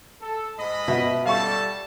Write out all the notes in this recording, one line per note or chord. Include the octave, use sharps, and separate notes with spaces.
A4
G#2 D#5 B5
B2 E5
G3 A4 F5 A5 C#6